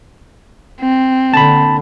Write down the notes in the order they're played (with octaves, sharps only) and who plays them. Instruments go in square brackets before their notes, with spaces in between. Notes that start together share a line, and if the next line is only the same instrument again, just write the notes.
[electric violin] C4
[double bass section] A#2 D3 [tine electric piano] A5 B5